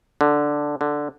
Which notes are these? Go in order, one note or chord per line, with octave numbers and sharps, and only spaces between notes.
D3
D3